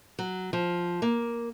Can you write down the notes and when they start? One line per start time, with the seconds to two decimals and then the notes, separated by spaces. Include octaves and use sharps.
0.19 F#3
0.53 F3
1.02 A#3